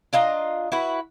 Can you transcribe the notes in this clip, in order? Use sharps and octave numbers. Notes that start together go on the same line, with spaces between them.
D4 F4 D#5 A#5
E4 F#4 B4